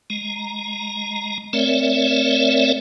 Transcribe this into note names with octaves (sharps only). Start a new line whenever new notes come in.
G#3 A#5
A3 C4 A#4 C#5 D5 E5